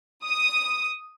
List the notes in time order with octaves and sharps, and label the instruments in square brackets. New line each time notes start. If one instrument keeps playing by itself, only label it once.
[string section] D#6